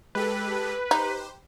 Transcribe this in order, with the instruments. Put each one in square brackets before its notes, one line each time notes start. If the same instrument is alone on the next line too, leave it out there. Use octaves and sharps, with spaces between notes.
[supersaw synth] G#3 G4 A4 [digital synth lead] B4
[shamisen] D#4 [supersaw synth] G4 C5